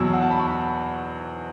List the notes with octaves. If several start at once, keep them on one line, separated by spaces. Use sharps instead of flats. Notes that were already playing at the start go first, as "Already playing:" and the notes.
Already playing: E2 B2 F#3 E6
F#5
A5
B5
C#6